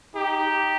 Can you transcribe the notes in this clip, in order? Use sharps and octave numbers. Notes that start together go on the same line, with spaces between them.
D#4 G4